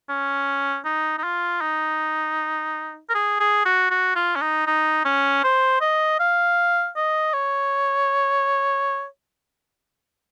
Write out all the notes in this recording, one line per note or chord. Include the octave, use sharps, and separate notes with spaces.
C#4
D#4
D#4
F4
D#4
A#4
G#4
G#4
F#4
F#4
F4
C#4
D#4
D#4
C#4
C5
D#5
F5
D#5
C#5